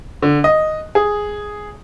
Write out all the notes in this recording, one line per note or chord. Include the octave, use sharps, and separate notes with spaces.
D3
D#5
G#4